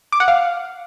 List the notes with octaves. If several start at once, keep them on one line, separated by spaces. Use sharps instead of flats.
D6
F#5
F5